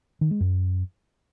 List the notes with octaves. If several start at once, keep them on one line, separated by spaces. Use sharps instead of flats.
D#3
G#3
F#2